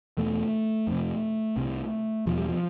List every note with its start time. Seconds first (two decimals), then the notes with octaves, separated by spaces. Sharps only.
0.17 E2 B2 A3
0.87 F2 C3
1.56 C2 C3
2.26 E2 B2 F3
2.38 G3
2.49 F3